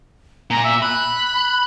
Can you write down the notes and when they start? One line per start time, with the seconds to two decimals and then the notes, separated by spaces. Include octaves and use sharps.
0.50 A#2 A#5
0.64 E5
0.82 B5 F#6